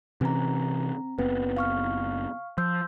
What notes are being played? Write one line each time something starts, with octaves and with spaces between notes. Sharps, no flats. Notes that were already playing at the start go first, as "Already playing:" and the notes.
C3 E3 C4 C#4 A#5
F#1 B3 C4 B4
F5 C#6 F6
F3 C6 E6 G6